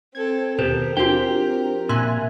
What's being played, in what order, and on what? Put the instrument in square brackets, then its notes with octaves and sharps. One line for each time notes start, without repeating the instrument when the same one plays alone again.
[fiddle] C4 A4 [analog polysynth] G#6
[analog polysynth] D#2 B2 [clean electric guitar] G4 A4 [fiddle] A#4 [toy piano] C5
[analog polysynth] F3 C4 [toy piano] D4 F#4 [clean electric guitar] G4 G5
[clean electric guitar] A#2 [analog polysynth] E5 G#5 F#6 [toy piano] C6